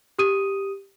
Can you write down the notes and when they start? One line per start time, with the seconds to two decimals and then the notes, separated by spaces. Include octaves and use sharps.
0.19 G4 D#6 D#7